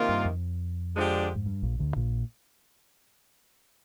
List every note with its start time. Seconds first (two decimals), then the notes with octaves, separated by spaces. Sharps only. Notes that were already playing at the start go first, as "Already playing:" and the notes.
Already playing: C3 D#3 A#3 F4
0.09 G2
0.25 F2
0.94 D3 F3 G#3 D4 G4
1.35 G#2
1.46 G2
1.63 A#1 A#2
1.79 D2 D3
1.96 A#1 A#2